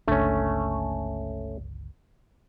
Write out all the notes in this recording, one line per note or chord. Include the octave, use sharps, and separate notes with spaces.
G1 C#2 A3 C#4 D4